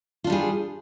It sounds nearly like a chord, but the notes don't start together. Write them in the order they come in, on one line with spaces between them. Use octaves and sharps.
F4 D4 G3 G#4